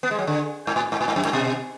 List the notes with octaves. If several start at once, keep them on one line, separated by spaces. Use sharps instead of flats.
B3
G#3
F#3
D3
G#2
A2
G#2
A2
G#2
F#2
G#2
B2